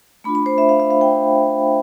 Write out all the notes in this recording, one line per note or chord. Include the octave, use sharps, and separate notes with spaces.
A3 D4 F4 B5
B5
C5
E5
F5
E5
F5
G5